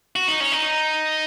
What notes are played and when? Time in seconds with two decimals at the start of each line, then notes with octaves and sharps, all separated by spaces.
0.16 F#4
0.28 D#4
0.40 C#4
0.52 D#4